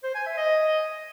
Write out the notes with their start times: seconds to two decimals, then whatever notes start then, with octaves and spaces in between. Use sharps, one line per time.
0.03 C5
0.15 G#5
0.26 E5
0.37 D#5